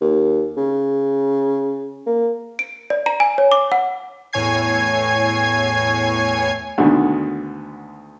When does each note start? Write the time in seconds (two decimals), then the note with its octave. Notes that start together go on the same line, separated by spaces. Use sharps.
0.01 D#2
0.57 C#3
2.07 A#3
2.59 D7
2.90 D5
3.06 A#5
3.20 G#5
3.38 C#5
3.52 D6
3.72 F#5
4.33 E2 A2 C#5 G#5 G#6 C7
6.78 D2 B2 D3 D#3 G#3